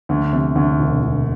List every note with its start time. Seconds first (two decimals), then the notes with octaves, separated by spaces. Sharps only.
0.09 D2
0.33 C3
0.55 D2
0.79 E1
1.02 E1